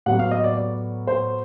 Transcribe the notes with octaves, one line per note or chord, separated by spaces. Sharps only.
A2 F#3 B3 F#5
F5
D#5
D5
D5
C5